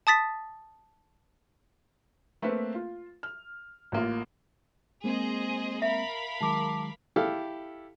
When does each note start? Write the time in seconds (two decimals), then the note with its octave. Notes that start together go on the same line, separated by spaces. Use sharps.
0.07 A5 D#6 A6 B6
2.42 A3 A#3 C4 B4
2.75 F4
3.23 F6
3.92 A1 A#3 F4
5.04 G#3 A#3 C4 G#4 C5 D#5
5.82 A#4 E5 F5 B5
6.41 D#3 F#3 G#3 A5 D6
7.16 E4 G4 A4 F5